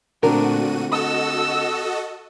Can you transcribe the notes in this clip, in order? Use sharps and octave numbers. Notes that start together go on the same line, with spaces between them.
A#2 D3 A3 C4 D4 F#4 A#4 D#7
F#4 A4 D#5 E6